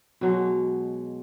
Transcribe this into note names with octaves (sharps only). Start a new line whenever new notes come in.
B2 F#3 G#3